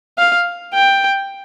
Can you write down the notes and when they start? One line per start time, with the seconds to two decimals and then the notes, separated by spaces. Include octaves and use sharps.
0.18 F5
0.74 G5